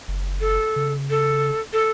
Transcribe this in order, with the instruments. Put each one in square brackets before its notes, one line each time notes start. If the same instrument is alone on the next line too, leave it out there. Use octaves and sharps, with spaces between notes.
[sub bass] F#1
[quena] A4
[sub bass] C#3
[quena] A4
A4